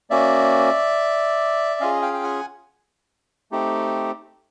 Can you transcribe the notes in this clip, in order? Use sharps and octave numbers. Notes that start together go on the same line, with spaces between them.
A#3 C#4 F#4 D5 E5
C#4 F4 G#4 D#5 F5
F5 G5
G5
F#5 G#5
A3 C4 D#4 G4